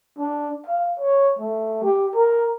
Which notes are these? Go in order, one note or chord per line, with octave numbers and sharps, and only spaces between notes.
D4
F5
C#5
A3
G4
A#4